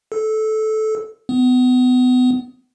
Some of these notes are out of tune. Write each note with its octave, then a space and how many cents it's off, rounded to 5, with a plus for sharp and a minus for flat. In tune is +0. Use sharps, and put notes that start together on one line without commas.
A4 -15
B3 +30